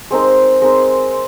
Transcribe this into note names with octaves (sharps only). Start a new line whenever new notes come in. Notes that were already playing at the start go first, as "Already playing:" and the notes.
G#3 C4 D#4 A#4
G#3 C4 D#4 A#4